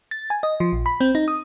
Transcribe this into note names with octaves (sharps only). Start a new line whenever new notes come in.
A6
G#5
D#5
F3
A#1
B5
C4
D#4
D#6